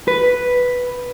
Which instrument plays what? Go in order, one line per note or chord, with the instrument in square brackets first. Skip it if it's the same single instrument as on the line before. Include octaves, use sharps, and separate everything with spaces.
[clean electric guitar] B4